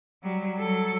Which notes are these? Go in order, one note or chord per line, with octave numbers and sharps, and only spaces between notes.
F#3 G3
F#3 A4